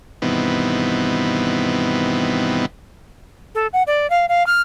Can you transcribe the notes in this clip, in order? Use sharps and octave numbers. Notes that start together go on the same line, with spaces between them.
G2 B2 D#3 E3 B3 C4
A4
F#5
D5
F5
F5
F6